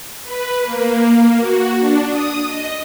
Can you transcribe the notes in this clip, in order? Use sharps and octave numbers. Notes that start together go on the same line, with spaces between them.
B4
A#3
A#3
F#4
D4
D#6
D#5